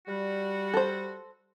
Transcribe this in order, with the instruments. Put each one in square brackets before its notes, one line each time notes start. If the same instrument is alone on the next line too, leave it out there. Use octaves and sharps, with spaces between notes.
[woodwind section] G3 F#4
[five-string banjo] A4 C5